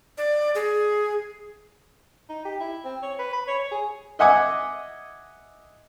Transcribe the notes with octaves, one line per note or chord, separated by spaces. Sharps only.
D5
G#4
D#4
G4
E4
C4
C#5
B4
B5
C#5
C#5
G#4
D#5 E5 F#5 G#5 D6